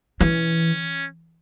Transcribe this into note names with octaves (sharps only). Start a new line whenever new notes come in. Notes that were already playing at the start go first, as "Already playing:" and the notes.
E3 C#4